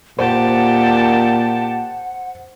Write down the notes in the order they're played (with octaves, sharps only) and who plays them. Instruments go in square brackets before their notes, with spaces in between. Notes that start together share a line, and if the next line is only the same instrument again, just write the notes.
[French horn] A#2 [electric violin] G4 A5 [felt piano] C5 [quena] F#5